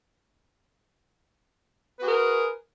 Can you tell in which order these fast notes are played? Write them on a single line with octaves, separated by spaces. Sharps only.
B4 F#4 G#4 A#4